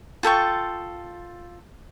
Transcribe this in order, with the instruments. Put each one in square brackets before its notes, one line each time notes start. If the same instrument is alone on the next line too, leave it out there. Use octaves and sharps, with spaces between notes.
[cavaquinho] F4 A4 G5 C#6